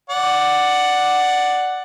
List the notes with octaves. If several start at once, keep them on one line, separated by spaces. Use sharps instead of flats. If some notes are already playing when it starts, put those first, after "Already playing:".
D5 F#5